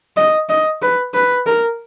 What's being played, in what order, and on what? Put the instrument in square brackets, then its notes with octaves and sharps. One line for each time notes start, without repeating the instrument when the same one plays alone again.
[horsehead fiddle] D#5
D#5
B4
B4
A#4